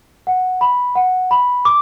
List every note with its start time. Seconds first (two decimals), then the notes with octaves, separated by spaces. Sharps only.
0.27 F#5
0.61 B5
0.95 F#5
1.31 B5
1.65 D6